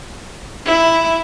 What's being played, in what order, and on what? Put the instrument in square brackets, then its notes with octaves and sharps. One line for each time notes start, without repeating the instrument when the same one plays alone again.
[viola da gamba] E4